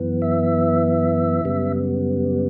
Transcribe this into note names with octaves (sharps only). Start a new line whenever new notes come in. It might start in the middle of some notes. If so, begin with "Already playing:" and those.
Already playing: F#2 E3 B3
E5
F#2 C#3 G3 B3